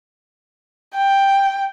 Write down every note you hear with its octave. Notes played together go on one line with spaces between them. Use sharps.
G5